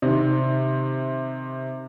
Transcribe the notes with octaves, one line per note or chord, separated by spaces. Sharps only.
C3 D#3